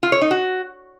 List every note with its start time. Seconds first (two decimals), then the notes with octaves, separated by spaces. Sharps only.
0.03 F4
0.12 C#5
0.21 D#4
0.31 F#4